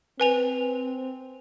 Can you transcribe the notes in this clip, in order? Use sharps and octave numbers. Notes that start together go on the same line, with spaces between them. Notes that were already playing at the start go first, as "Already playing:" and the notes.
C4 B4 G#5 F7